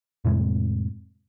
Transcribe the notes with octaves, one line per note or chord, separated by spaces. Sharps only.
F2 A2 C3 G#3